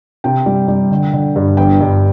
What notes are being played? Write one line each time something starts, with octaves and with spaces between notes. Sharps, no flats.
C3 G5
G3
G3
D3
D3
G2
G1 G5
G2